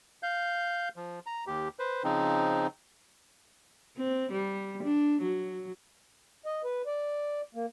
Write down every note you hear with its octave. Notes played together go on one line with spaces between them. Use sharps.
F5 G6
F3
A#5
D#2 G4
B4 C5
C#3 F3 C4 D#4
C4
G3
D4
F#3
D#5
B4
D5
A#3